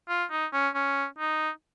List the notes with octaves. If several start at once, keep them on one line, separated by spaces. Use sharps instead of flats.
F4
D#4
C#4
C#4
D#4